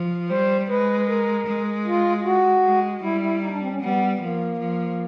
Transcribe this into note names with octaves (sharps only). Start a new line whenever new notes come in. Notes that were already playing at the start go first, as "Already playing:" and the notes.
Already playing: F3
G3 C5
G#3 B4
A#4
G#3
F4
F#4
G#3
G3 E4
E4
D#4
D4
C4
C#4
G3 B3
F3 A#3
F3